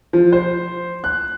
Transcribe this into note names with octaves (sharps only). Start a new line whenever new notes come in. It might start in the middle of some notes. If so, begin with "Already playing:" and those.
F3
C5
F#6